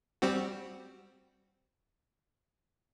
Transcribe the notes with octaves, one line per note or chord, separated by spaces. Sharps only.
G3 C4 F#4